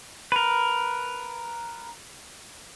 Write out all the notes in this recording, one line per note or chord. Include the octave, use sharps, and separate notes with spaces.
A#4 B4